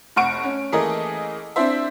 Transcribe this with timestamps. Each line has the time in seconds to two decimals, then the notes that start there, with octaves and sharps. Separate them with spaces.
0.16 F1 F#5 C#6 D7
0.43 C#4
0.72 E3 A3 A#3 G#4 A#4 D#5
1.56 C4 D4 E4 C5 E5